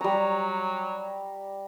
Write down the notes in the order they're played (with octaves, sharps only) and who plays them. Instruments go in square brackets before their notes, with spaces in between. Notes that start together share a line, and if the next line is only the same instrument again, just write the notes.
[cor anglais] F#3 [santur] G3 A#5